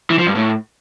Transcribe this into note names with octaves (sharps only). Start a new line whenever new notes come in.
E3
F3
G2
A2